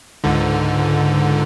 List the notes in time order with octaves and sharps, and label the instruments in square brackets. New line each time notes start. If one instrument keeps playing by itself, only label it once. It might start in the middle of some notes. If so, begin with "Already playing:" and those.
[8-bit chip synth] C#2 G#2 D3